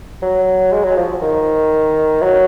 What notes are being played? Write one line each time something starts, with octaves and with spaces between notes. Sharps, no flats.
F#3
G#3
F#3
F3
D#3
F#3